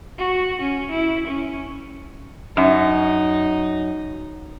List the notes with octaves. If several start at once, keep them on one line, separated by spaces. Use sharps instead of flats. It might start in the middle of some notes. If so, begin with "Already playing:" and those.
F#4
C#4
E4
C#4
F#2 D#4